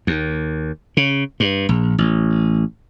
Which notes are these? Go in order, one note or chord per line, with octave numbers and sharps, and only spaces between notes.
D#2
C#3
G2
A#1
A1